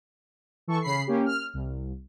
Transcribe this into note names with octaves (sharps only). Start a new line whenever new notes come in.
E3 A4 C#6
C#3 B5 C7
A#3 C#4 G4
F6
C2